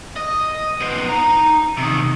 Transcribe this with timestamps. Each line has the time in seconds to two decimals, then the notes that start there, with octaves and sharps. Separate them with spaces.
0.16 D#5
0.81 B3 C5
1.09 D#4 A#5
1.77 C3 D#3